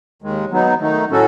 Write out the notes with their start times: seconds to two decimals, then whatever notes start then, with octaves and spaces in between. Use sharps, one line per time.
0.22 D#2 D#3 G#3
0.51 F#3 B3 D#4
0.81 D#3 A3 D#4
1.11 A2 F#3 C#4 F#4 A4